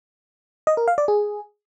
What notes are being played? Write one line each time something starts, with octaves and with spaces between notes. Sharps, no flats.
D#5
A#4
F5
D5
G#4